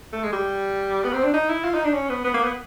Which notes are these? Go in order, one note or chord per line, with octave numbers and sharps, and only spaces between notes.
A3
G#3
G3
B3
C4
D4
D#4
E4
F4
D#4
D4
C#4
B3
B3
A#3
B3